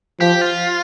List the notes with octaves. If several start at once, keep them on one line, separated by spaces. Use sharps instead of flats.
F3 G4
F4